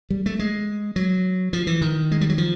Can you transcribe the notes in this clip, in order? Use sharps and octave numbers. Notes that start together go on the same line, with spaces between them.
G3
A3
G#3
F#3
F3
E3
D#3
G#3
G3
F#3
F3